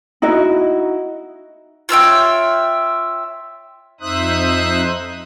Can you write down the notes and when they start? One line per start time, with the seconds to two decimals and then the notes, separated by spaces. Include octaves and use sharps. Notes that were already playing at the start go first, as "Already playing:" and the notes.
0.22 D#4 E4 F#4 D#5
1.89 F4 C#5 E5 G5
4.00 F2 D#4 C5 E5 D#6 F#6